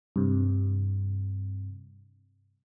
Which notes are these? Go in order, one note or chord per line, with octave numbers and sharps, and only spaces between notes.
G2 C3